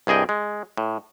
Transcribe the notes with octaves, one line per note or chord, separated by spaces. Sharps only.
C2 G2 G#4 D#5 G5
G#3
A2